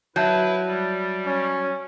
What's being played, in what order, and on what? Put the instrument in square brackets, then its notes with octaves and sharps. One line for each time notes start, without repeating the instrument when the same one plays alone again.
[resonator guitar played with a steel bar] F#3 [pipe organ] E4 B4 [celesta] E5 A5 G6
[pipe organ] G3
[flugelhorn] C#4